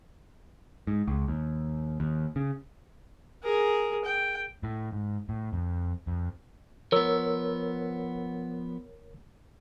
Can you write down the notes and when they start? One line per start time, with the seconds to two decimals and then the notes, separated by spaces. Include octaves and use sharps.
0.87 G#2
1.08 C#2
1.28 D#2
2.00 D#2
2.36 C#3
3.43 G#4 A#4
4.05 G5
4.63 A2
4.92 G#2
5.29 A2
5.53 F2
6.07 F2
6.92 F3 B3 A#4 C#5 E6